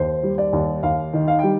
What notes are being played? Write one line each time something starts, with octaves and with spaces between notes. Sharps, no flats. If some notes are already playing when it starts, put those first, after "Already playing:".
Already playing: D#2 C5
G3
D5
D#2
D#2 F5
D#3
F5
G3 G5